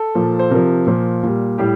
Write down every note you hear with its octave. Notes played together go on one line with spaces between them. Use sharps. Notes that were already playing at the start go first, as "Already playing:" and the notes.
Already playing: A4
A#2 F3
C5
C3 F3 A#4
A#2 F3
A#2 G3
A2 G3 G4